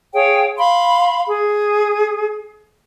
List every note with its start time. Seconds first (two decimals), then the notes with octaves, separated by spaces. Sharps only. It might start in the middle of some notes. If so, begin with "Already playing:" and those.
0.13 G#4 C#5 F5 G5
0.57 F5 B5 C6
1.26 G#4